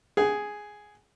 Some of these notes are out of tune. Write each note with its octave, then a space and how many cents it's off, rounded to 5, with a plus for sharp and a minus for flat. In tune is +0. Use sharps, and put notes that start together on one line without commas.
G#4 +0 F#5 +45